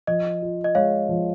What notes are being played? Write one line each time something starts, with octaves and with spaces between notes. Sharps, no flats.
F3 D#5
F4
D#5
G#3 C#5 F5
F3